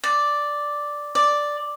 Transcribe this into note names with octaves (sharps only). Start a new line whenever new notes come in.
D5
D5